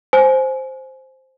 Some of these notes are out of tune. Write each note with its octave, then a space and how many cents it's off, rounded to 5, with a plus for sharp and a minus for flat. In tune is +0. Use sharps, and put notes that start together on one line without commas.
C5 +0 G#5 +25